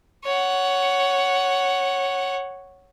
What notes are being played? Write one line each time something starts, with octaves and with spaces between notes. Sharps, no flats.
C#5 F#5